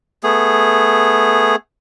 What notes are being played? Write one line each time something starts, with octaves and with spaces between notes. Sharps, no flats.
A3 B3 G#4